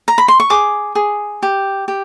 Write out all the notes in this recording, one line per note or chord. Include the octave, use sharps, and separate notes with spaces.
A#5
B5
C6
C#6
G#4 D6
G#4
G4
G4